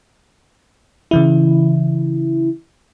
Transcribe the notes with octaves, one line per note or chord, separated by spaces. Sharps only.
C#3 E3 E4